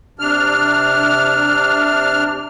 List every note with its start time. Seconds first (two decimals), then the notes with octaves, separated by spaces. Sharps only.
0.19 C3 D4 F6